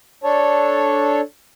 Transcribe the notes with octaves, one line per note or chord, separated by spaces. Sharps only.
D4 A4 C#5